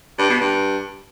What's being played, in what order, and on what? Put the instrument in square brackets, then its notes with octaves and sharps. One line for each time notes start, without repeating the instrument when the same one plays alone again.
[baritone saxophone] G2
B2
G2